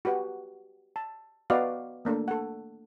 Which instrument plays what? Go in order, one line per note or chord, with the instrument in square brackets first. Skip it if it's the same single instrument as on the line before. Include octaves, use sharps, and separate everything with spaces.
[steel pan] F#4 G4 B4 F#5
A5
B3 F#4 B4 D5 D#5 F5
A3 A#3 D4 A4
A4 F#5